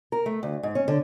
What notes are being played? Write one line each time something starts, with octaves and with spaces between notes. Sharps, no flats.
A#4
A3
D2
G#2
C#4
D3